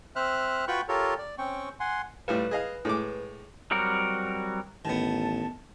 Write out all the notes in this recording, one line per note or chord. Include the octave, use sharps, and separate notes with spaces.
C4 C5 E5 F6 F#6
F4 F#4 B4 G5 B5 C#6
F4 G4 A4 A#4 C#5
D5
C4 C#4 G5 C#6
F#5 G#5 C6
A2 G3 F4 B4
G#4 D#5 F5
A2 G#3 D6
F#3 G3 C4 F#4 A#4
A1 D#3 B3 A5